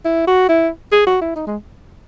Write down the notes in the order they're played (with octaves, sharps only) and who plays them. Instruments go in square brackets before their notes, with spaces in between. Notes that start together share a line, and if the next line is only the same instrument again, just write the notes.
[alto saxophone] E4
F#4
E4
G#4
F#4
E4
D#4
G#3